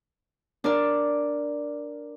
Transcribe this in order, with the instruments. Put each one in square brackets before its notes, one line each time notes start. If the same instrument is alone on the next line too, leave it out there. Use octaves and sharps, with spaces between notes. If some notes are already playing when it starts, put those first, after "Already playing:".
[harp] D4 A#4 D5